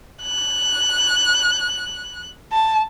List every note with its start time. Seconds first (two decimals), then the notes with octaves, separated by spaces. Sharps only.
0.23 F#6
2.52 A5